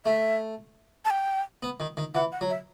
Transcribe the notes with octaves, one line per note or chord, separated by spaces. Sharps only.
A3 E5
A5
G5
B3
D#3
D#3
E3 F#5
F#5
F#3
E5